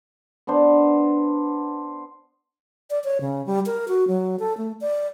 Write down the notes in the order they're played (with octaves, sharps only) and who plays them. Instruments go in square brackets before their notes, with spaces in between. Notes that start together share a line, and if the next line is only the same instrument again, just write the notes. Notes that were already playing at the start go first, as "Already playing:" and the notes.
[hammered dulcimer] B3 D4 C5
[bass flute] D5
C#5
C#3
G3
A#4
F#4
F#3
A4
A3
D5